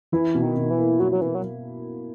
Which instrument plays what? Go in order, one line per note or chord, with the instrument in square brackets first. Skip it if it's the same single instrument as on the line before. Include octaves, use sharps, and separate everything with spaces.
[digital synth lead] E3 [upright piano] E4
[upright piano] B2
[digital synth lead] D#3
[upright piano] B2
[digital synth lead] E3
[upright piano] A#3
[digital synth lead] F#3 [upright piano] E4
[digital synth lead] F#3
[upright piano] B2 [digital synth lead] E3
[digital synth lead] F#3